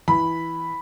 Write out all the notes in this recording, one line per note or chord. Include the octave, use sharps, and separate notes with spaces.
E3 B5